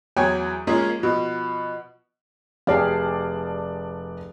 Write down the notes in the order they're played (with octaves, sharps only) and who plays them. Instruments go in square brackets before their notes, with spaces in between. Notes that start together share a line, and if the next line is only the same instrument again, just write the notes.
[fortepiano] E2 F#3 C#5 G5 G#5
G#3 A#3 C#4 F4 G#4
B2 F3
[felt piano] F1 D5 A5 [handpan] G4 G#4 F5